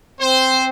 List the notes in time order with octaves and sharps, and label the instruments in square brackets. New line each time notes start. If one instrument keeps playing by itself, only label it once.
[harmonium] C4 [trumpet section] C5